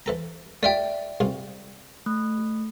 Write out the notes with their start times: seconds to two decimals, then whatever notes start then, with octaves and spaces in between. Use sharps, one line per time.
0.06 E3 A4 A#5
0.63 A3 F4 G4 D5 E5 G5
1.20 C2 F4 G#4
2.06 A3